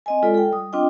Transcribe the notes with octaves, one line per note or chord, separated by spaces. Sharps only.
C4 D#5 G#5
G#3 F4 A4 D5
A4 G5
G3 D#6
C4 D4 F4 D#5 G5